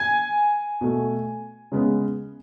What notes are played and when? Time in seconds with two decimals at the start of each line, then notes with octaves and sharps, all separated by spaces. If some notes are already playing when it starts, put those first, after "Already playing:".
Already playing: G#5 G#6
0.81 B2 A3
1.72 C#3 G#3 B3